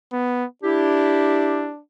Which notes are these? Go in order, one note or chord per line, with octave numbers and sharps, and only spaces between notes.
B3
D4 E4 G4